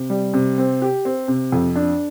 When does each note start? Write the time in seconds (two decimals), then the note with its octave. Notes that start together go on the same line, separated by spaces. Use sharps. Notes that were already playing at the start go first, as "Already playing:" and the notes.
Already playing: C3
0.10 G3
0.33 C3
0.58 C4
0.82 G4
1.05 C4
1.28 C3
1.52 F2
1.76 D4